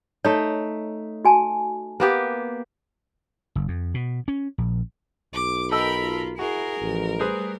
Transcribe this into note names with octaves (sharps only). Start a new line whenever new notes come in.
A3 D#4 C#5
F#4 G#5 A5
A#3 B3 G4
F#1
F2
B2
C#4
A#1
B1 D6
A4 A#4 D#5 G5 B5 E6
F4
E4 F#4 G#4 A#4
A1 F3
G3 A3 G#4 B4 C5